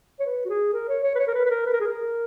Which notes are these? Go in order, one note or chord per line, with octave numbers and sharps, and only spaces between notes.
C#5
B4
F#4
G#4
A#4
C#5
C#5
B4
C#5
A#4
B4
B4
A#4
B4
A#4
G#4
A#4